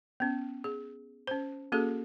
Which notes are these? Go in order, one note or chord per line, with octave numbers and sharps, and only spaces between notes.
B3 C#4
G#4
C#4 C5
A#3 C#4 F#4 G#4 A4